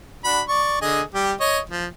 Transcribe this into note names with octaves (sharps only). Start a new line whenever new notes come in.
D4 F#4 B5
D5 C#6
D3 G#4 D#5
G3 G4
C#5 D#5
F3